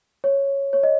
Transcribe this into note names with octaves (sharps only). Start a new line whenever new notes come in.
C#5
C#5
D#5